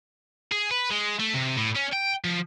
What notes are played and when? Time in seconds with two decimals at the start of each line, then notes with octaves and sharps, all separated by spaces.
0.52 G#4
0.71 B4
0.91 G#3
1.20 A3
1.34 C3
1.57 A2
1.76 C#4
1.93 G5
2.25 F3